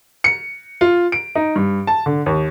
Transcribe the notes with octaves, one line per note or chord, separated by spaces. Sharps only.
C#7
F4
D7
D#4
G2
A5
D3
D#2